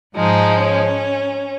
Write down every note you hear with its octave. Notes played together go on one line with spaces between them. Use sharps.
G#2 F3 G#3 D#4
C#4